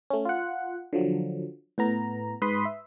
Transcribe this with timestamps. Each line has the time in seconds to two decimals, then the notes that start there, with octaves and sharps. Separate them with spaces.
0.10 A3 C#4
0.25 F4 F#5
0.93 D3 F3 F#3
1.78 A2 B3 A#5
2.42 G#2 B4 B5 C6 D#6 B6
2.65 E5